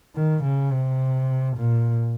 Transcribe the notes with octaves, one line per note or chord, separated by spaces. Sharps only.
D#3
C#3
C3
A#2